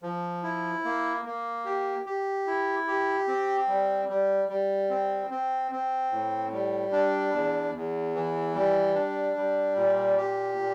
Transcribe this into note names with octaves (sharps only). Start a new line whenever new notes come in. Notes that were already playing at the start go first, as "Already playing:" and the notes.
F3
E4
A#3
A#3
G4
G4
E4
G4
C4
G3
G3
G3
C4
C4
C4
A2
G3
D4
E2
E2
E3
G3
D4
G3
A#2
G4
A#2